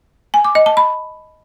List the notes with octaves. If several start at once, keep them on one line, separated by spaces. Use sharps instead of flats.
G#5
D6
D#5
A5
B5